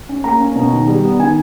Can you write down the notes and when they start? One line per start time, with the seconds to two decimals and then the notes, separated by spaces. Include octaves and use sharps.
0.09 C#4
0.24 A#3 A#5
0.41 C#4
0.56 B2
0.72 D#3
0.88 G3
1.04 B3
1.19 D#3 G#5